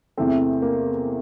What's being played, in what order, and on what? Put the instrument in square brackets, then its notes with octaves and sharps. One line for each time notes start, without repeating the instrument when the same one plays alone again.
[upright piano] E2 C3 E3 A3 C4
A#3